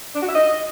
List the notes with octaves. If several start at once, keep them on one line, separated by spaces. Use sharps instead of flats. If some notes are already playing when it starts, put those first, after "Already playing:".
D4
F#4
E5
D#5